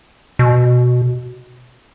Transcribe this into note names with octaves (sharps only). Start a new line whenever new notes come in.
B2